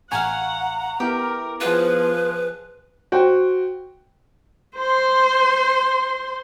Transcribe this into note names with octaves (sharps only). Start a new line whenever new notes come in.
A1 F5 F#5 G#5 A#5 C#6
B3 E4 G4 A#4
F3 F4 G#4 B4 F#5 C6
F#4 C5 G5
C5 C6